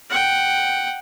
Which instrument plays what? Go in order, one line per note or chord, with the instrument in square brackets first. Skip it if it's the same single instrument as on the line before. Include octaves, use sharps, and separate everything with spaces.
[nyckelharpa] F#5 G5